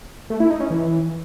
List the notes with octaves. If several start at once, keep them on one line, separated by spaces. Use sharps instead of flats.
A3
E4
D#4
C#4
E3